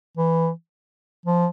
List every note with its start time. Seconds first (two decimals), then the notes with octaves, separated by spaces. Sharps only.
0.17 E3
1.26 F3